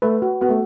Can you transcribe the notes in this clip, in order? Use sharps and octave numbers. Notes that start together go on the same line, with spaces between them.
A3 B4
F#4
B3 F#4
A3